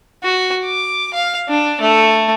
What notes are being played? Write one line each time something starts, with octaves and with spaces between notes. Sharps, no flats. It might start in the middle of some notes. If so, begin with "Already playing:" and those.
F#4
D6
F5
D4
A3